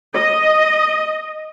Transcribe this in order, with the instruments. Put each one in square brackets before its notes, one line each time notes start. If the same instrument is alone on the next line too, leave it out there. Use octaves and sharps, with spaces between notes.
[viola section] D#5